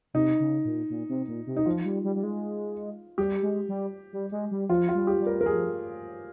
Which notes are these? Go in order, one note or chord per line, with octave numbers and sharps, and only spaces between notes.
C3 D#4
C#3
A#2
A#2
C3
A#2
C3
D#4
F3 F4
G3
G3
G3
G#3
G3 G4
G#3
G3
G3
G#3
G3
F3 F4
F4
G3
G4
G3
A#4
A#4
F3 G#4